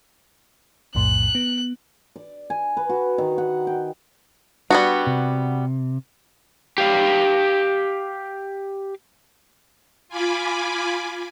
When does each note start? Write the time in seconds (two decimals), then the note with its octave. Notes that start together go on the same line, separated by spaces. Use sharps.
0.95 B1 F2 A2 F#6
1.35 B3
2.16 D5
2.50 G#5
2.77 B4
2.89 F#4
3.18 D#3
3.38 F#5
3.67 G5
4.70 G3 B3 D4 F#4
5.07 C3
6.78 G4 F5
10.09 F4 G#5 B5 D6